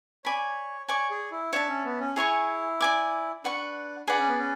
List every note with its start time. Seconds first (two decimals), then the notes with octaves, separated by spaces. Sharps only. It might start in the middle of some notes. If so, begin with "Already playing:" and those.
0.25 C#5 D5 G#5 B5
0.88 C#5 D5 G#5 C#6
1.10 G#4
1.32 E4
1.53 D4 C#5 E5 A5
1.69 C#4
1.85 B3
2.00 C#4
2.16 E4 G#4 C#5 G#5 C#6
2.81 D5 G#5 D6
3.44 D4 B4 F#5 C#6
4.07 D4 G#4 B4 D5 F#5
4.18 C#4
4.28 B3
4.39 C#4